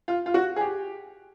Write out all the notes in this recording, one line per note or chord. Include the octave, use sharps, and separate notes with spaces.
F4
F4
F#4
G#4
G4